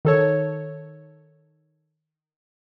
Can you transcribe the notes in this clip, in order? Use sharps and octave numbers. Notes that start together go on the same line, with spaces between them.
D#3 A4 C#5